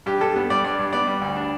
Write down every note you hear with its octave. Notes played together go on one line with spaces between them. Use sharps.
G2 G4
G2 A4
B3
G3 D5
G2 D5
G2
B3 D5
G3
D2
D4